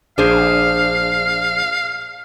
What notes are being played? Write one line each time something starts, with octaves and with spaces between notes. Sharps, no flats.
A#1 D4 G#4 C5 F5